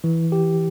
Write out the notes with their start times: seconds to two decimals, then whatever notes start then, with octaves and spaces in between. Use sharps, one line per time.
0.04 E3
0.32 G4